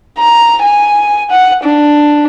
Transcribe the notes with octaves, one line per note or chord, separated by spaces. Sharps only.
A#5
G#5
F#5
D4